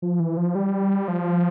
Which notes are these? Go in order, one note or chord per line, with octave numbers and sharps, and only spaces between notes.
F3
E3
F3
G3
F3